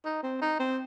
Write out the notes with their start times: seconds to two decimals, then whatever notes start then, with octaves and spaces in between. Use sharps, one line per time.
0.05 D#4
0.23 C4
0.41 D#4
0.59 C4